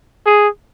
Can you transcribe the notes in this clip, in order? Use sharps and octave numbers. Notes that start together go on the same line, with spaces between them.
G#4